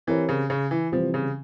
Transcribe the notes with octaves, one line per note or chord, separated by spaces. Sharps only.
E3 C4 G4 A#4 C#5
C#3
C#3
E3
C3 E3 F3 G3 C4
C#3